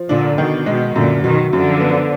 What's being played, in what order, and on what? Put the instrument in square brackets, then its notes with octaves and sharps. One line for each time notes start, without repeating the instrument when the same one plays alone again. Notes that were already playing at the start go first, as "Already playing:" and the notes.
Already playing: [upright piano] F3
[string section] A#2 D3 [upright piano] D4
[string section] B2 [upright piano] D#3
[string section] B2 [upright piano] G#3
[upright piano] F#2 [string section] A#2 D3
[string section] B2 D#3 [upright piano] F#3
[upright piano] F#2 [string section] D3 F3
[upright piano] B3